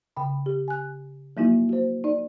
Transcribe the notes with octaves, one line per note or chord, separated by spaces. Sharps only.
C#3 G5 B5
G4
G#5 F#6
F3 F#3 A#3 D#4 E4 F#4
F#4 C5
D#4 D5